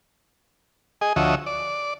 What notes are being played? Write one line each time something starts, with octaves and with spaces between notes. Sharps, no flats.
G#4 D#5
D2 F3 F#4 C#5 D#5 E5
D5